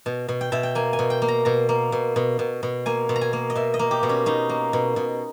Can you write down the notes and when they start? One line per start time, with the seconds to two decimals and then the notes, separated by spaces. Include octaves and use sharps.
0.06 B2
0.28 B2
0.41 G5
0.52 B2 E5
0.63 G5
0.75 A#3 G#5
0.93 G#5
0.99 B2
1.10 G5
1.22 A#3
1.28 A#5
1.45 B2 A#5
1.69 A#3
1.92 B2
2.16 B2
2.39 B2
2.63 B2
2.86 A#3 G#5
3.09 B2
3.16 A#5
3.21 G#5
3.33 A#3
3.50 D#5
3.55 B2 E5
3.74 D#5
3.79 A#3
3.91 G4
4.03 B2
4.09 C#4
4.26 B2 D#4
4.49 A#3
4.73 B2
4.96 B2